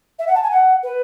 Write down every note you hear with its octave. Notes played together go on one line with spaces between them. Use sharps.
E5
F#5
A5
G#5
F#5
B4